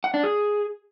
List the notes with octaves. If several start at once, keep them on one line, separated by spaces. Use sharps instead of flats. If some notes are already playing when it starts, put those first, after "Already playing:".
F#5
D4
G#4